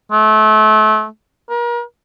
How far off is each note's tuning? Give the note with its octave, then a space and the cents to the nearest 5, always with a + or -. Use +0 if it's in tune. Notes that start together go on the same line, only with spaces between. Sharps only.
A3 -30
A#4 +35